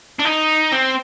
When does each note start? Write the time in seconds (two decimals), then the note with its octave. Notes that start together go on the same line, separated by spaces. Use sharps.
0.19 D4
0.25 D#4
0.72 C4